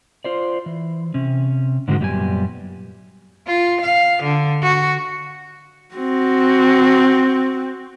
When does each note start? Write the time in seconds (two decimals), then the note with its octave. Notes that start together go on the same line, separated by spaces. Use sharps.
0.25 F4 C5 D5
0.66 E3
1.14 C3 C#4
1.88 G#2 D3 D#3 G#3 F#4
2.01 F#2 A#2 G3 B3 F4 G#5
3.47 F4
3.81 F5
4.23 D3
4.62 F#4
5.95 C4 F#4